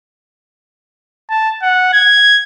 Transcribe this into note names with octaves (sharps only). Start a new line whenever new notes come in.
A5
F#5
G#6